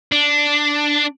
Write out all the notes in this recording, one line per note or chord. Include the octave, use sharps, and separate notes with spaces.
D4